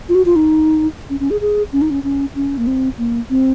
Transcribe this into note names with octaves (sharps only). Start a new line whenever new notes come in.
F4
F#4
F4
D#4
C#4
C#4
G#4
G#4
C#4
D#4
C#4
C#4
C#4
A#3
C4
A#3
C4